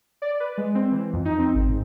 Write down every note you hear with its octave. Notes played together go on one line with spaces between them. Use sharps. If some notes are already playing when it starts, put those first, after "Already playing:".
D5
B4
G#3
C4
E3
F2
D#4
C4
G#1
G#2